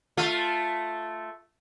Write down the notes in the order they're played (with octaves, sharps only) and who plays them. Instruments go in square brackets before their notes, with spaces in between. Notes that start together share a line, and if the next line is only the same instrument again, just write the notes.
[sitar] A3 F4